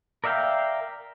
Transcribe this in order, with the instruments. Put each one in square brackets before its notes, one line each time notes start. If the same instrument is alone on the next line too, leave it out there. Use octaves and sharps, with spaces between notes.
[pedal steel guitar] A#4 D5 E5 F5 G5